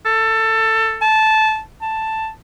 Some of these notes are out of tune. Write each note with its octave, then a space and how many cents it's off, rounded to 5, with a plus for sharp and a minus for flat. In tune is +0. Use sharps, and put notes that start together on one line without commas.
A4 +20
A5 -15
A5 +5